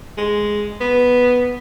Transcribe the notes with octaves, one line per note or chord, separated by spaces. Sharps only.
G#3
B3